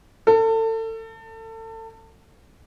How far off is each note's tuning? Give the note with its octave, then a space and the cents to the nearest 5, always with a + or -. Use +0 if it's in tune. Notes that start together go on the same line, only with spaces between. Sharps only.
A4 +30